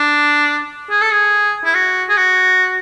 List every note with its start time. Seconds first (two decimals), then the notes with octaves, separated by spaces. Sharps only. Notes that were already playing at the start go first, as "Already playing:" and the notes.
Already playing: D4
0.90 G#4
1.01 A4
1.11 G#4
1.65 E4
1.74 F#4
2.09 G#4
2.17 F#4